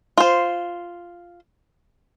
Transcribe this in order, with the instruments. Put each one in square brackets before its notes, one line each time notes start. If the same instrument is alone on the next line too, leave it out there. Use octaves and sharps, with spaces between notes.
[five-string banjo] F4 C5